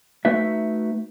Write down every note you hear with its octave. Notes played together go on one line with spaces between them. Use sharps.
A3 D#4 F#4 B4 E5